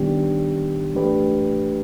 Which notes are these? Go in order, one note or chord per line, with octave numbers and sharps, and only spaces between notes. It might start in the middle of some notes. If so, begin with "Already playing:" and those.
Already playing: D#3 G3 B3 D4 G4
E3 A3 D4 G4 B4